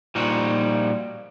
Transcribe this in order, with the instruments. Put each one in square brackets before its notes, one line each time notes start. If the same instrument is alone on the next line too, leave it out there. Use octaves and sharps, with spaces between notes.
[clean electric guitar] A#2 F3 G3 D#4 F#4